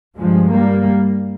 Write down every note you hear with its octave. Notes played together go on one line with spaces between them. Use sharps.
G2 F3 G#3
G3 A#3